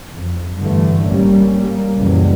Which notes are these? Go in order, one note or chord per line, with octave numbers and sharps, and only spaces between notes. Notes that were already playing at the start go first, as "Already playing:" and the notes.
F2
G2 D3 E3 A3
G#1 G3 A#3 C#4
G3 A#3
F#1 C#2 A#2 E3 F#3 G3